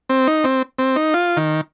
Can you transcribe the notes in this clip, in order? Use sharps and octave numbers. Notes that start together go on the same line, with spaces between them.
C4
D#4
C4
C4
D#4
F4
D#3